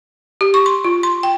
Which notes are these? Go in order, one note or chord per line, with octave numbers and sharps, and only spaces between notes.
G4
C#6
C6
F4
C6
G5